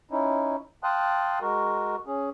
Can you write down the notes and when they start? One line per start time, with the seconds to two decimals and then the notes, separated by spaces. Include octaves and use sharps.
0.11 C#4 D#4 E4
0.84 F5 G5 A5 C6 D#6 F#6
1.41 G#3 F#4 A#4
2.07 C#4 G#4